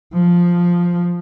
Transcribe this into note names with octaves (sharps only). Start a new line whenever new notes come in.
F3